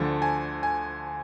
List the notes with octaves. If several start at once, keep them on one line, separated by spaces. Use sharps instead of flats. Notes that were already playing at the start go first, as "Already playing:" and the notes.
Already playing: D2 D3 F3 A5
G#5
G#5